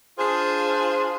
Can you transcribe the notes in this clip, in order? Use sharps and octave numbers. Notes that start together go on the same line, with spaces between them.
D4 F4 G#4 C5